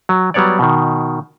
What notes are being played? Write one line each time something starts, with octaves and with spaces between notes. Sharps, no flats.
F#3
F#3 G3 B3 C#5 D5
B2 D#3